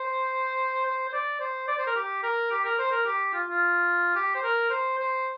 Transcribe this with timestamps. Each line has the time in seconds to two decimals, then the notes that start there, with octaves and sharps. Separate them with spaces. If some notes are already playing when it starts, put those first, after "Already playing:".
Already playing: C5
0.86 C5
1.08 C5
1.13 D5
1.40 C5
1.68 D5
1.78 C5
1.87 A#4
1.96 G4
2.23 A#4
2.51 G4
2.64 A#4
2.78 C5
2.91 A#4
3.06 G4
3.33 F4
3.49 F4
4.15 G4
4.35 C5
4.43 A#4
4.70 C5
4.98 C5